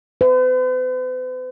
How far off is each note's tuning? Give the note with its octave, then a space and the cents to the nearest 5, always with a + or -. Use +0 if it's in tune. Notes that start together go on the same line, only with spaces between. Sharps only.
B4 +45